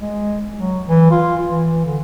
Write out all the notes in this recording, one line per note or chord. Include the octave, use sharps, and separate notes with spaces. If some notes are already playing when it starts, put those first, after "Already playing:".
G#3
F#3
E3
F4
E3
D3